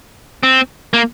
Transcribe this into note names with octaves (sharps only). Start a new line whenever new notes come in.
C4
A#3